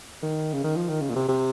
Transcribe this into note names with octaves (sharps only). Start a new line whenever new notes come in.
D#3
C#3
D#3
F3
D#3
C#3
A#2
C3
C3